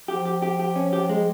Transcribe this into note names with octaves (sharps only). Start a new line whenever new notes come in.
F3 G4
G4
G4
G4
C#4
G4
G#3